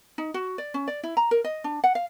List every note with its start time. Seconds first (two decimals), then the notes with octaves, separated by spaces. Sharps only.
0.18 D#4
0.34 F#4
0.58 D5
0.74 C#4
0.88 D5
1.03 E4
1.17 A#5
1.31 A#4
1.44 D#5
1.64 D4
1.84 F#5
1.95 F5